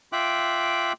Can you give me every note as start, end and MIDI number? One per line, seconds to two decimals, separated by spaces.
0.12 0.93 65
0.12 0.93 76
0.12 0.93 79
0.12 0.93 86
0.12 0.93 90